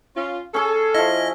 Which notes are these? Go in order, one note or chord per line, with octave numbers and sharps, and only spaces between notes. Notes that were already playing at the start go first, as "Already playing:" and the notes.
C#4 F4
C#4 G#4 A4
F3 E4 D#5